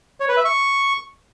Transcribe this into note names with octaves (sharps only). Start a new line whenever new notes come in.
C#5
B4
E5
C#6